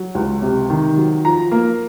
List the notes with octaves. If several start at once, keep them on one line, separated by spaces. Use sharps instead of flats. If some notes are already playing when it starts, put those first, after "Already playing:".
Already playing: F#3
C#2
C3
D#3
F#3
F3 A#5
A#3